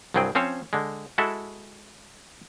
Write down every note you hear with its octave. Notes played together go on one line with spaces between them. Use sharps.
C2 G2 F#3 C4 G#4 G5
F3 C4 C#4 C5 C#5
D3 G#3
G#3 E4 F#4 A4 E5